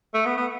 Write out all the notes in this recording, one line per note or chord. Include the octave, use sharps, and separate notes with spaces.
A3
B3
B3